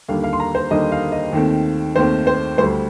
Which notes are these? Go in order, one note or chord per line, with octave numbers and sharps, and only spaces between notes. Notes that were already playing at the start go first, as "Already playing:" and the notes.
D#2 D3 G3 A#3 D4 F5
F5
C6
A#5
C5
D#2 D3 G3 A#3 D4 D#5
F5
D#5
D#2 D#3 A3 C4
D#2 D#3 A3 C4 C5
C5
D2 D3 G3 C5